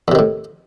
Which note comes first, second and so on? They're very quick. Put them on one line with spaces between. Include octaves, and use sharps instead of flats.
E2 C3 D#3 A2